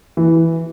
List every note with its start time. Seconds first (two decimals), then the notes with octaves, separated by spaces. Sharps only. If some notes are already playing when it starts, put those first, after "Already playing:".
0.17 E3